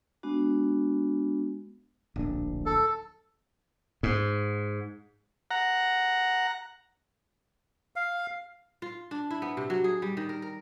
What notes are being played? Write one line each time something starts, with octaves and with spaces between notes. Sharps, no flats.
G#3 B3 D4 F#4
D1 A#1 D4
A4
G#2
F#5 A#5
F5
F4
D4
E4
B3
C3
F#3
G#4
G3
D#3
A#4
A#4